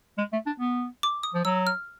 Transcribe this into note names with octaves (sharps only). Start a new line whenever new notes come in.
G#3
A3
D4
B3
D6
D#6
F3
F#3 E6
F6